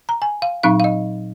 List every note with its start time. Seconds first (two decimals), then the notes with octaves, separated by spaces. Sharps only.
0.09 A#5
0.22 G#5
0.42 F5
0.63 A#2 F#3 C4 D#4 F5
0.80 F5
0.84 D#5